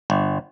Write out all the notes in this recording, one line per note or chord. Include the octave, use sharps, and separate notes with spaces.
G1